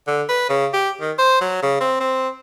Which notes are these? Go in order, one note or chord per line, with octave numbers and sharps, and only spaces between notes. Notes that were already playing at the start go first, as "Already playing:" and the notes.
D3
B4
C#3
G4
D#3
C5
F#3
C#3
C4
C4